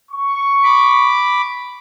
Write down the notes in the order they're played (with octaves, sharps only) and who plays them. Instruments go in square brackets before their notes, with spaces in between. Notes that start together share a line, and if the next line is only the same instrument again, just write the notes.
[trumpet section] C#6
[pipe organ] B5 D6